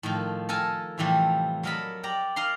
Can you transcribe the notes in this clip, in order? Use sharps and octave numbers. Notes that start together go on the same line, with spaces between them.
A2 D#3 F3
A4 A#4 G#5 A5
A2 C3 E3 F3 G3 A3
F#3 A4 A#4 D#5 A5 B5
G4 D5 A#5
D5 D#5 F5 A#5 C6